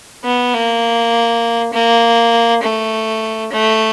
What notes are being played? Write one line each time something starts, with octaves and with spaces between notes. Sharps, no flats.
B3
A#3
A#3
A3
A3